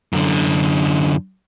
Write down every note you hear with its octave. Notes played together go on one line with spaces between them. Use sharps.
F#2 D3